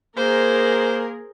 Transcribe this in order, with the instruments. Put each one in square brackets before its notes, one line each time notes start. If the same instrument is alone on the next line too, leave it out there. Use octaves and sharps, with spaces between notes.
[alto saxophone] A#3 [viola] G#4 A#4 [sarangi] C5